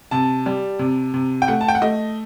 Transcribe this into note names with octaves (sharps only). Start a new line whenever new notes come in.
C3 A5
G3
C3
C3
G5
A3 F#5
A5
G5
F#5
A3 D#5